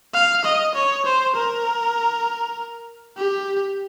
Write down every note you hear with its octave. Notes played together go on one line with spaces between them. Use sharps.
F5
D#5
C#5
C5
A#4
G4